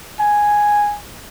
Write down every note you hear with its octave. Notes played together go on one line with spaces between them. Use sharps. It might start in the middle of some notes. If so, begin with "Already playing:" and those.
G#5